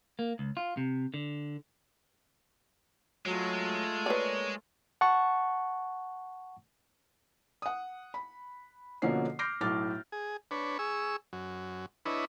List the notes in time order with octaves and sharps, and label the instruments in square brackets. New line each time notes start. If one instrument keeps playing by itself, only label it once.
[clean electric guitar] A#3
C#2
F4
C3
D3
[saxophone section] F#3 [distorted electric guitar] G#3 [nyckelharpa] A3 F4
[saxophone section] A#3 C#5 [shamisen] B4 D5
[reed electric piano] F#5 A5 C#6
[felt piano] F#5 D#6
B5
B2 D3 F3 A#3 C#4 C7
D6 F6 G6 A#6 C7 D7
B1 A2 A3 D6 F6 A6
[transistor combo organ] G#4
D4 B4 C#5
G#4 C#6 E6
F#2
D4 E4 B4 C#5 D#5